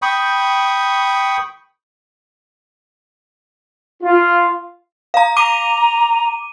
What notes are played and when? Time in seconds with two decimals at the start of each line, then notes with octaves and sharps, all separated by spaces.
0.02 G5 B5 C#6 D#6
4.03 F4
5.14 F5 A#5
5.37 A#5 D6 D#7